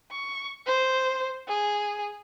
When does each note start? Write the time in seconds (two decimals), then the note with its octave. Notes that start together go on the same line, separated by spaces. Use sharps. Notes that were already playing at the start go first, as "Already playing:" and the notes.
0.11 C#6
0.66 C5
1.48 G#4